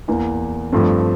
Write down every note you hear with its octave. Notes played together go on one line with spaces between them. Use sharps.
E2 E3 A#3
G2 F3 A3 C4